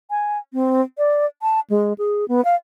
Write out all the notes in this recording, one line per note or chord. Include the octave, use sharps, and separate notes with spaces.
G#5
C4
D5
A5
G#3
G#4
B3
F5